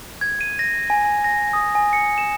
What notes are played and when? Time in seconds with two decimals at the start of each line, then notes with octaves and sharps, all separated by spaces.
0.21 G#6
0.41 D#7
0.59 A#6
0.90 G#5
1.05 G#5
1.24 A#6
1.53 D#6
1.75 G#5
1.93 C#7
2.18 E7